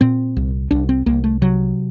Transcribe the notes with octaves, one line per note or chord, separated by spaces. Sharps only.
A#2 C4
C2
C2 D4
C4
C2 A#3
A3
C3 F#3